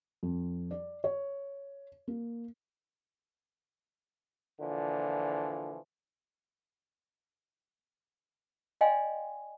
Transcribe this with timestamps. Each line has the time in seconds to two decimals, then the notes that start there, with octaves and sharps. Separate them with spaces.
0.23 F2
0.71 D5
1.04 C#5
2.08 A#3
4.60 A#2 D3 E3 F3
8.81 D5 D#5 F5 G5 G#5 C6